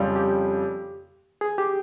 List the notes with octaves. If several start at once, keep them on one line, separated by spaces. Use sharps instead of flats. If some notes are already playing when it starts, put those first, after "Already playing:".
Already playing: F2 C#3 G3
G4
G#4
G4